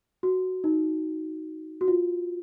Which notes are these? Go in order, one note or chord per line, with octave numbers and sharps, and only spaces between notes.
F#4
D#4
F#4
F4